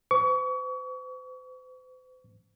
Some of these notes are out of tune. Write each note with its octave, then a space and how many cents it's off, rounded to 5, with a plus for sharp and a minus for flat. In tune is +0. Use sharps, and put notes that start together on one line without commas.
C5 -45 C#6 +35